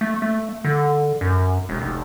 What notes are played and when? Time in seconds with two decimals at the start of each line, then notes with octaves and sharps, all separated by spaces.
0.01 A3
0.22 A3
0.64 D3
1.21 F#2
1.69 E1
1.81 F1